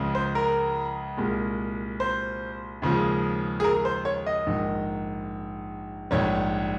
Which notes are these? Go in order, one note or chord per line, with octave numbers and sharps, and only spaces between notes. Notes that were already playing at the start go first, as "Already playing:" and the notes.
Already playing: C#2 C#3 F3 G#3
C5
A#4
C2 A#2 G#3
C5
D#2 C#3 F3 G#3
G#4
A#4
C5
C#5
D#5
A#1 G#2 D#3
A#1 G#2 G3 C#5